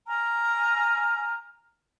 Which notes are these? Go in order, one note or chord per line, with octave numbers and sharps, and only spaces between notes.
G#5 A#5 F6